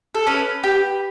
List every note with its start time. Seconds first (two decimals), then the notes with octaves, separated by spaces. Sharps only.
0.15 A4
0.26 C#4 B4
0.64 G4